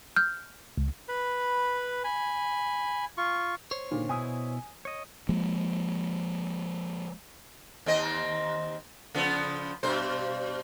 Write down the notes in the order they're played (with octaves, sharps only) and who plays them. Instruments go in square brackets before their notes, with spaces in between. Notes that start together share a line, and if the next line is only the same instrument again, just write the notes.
[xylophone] F6 G6
[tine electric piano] C#2
[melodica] B4 B5
G#5 B5
F4 C#6
[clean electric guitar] C5 C#5
[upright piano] A#2 D3 D#3
[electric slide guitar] B2 E4 [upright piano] G#5 D#6
[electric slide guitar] C#5 D#5
[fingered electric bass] F3 G#3 A#3
[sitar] D#2 C4 D#5
C#3 F3 B3
G2 B2 C5